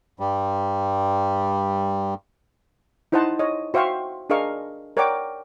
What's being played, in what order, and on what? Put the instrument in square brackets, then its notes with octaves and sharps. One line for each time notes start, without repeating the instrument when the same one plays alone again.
[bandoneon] G2 G3
[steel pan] D#4 E4 C5 D#5 F#5 A5
C#5 D#5
F#4 C5 E5 F5 G5 C#6
D4 G#4 A#4 D#5 F5 C#6
A#4 C#5 D5 F#5 G5 D6